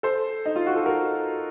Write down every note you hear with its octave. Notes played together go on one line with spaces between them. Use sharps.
A4 C5
D#4
F4
F#4
A4
F#4 A#4